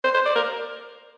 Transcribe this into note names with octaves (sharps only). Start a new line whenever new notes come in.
C5
C5
D5
A#4